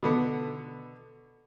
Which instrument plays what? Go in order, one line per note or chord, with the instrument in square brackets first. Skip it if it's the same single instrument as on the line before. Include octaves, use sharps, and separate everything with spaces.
[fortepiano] B2 D3 B3